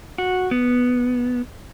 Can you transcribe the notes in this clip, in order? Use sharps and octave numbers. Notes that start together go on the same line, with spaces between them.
F#4
B3